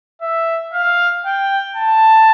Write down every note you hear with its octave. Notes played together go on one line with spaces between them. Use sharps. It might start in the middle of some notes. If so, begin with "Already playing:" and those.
E5
F5
G5
A5